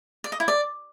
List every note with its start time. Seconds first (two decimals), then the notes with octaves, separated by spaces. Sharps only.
0.24 D5
0.32 D#5
0.40 E4
0.48 D5